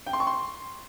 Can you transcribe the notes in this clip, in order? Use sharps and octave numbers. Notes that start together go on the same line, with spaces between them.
G5
C6
C#6
C6